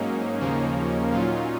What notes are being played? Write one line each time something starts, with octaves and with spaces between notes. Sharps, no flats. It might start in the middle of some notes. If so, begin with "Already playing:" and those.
Already playing: G#2 F#3 A#3 C#4 D#4
D#2 C#3 F3 A#3 C#4
A#2 F#3 C#4 F4